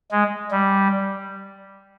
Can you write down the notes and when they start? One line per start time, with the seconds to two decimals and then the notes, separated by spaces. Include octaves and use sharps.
0.11 G#3
0.51 G3